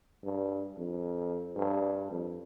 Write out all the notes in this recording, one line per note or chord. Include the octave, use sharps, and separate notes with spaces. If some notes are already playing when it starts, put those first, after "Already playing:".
G2
F2
G2
F2